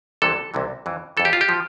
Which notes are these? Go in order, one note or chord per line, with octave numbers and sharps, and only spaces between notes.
C2 C3 E3 A4
C2 C3 E3
F2 E3
F2 E3 A4
G4
F4
G4
F3